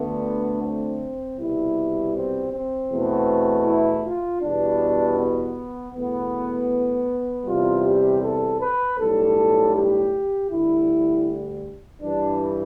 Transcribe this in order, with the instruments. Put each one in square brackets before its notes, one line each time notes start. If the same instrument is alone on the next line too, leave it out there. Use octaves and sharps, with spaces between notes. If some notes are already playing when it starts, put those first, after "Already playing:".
Already playing: [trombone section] D2 D3 A3 B3
C4
C2 B2 G3 E4
C4
C4
E2 B2 A3
E4
F4
E2 B2 G3 D4
B3
E2 B2 A3 B3
E2 C3 G3 F4
G4
A4
B4
B1 A2 G3 A4
G4
D2 D3 G3 E4
G2 E3 G3 D4